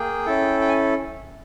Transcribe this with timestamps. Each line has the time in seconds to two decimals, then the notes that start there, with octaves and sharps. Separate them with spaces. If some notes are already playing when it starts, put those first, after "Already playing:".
Already playing: A#3 G#4 G5
0.25 C#4 E4 A4
0.61 G5
0.69 G#5